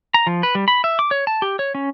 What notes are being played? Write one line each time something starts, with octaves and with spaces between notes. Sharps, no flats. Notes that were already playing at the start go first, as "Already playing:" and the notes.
A#5
F3
B4
G3
B5
E5
D6
C#5
A5
G4
C#5
C#4